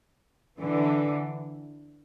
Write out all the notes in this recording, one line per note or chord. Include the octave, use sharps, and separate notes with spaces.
D3 E3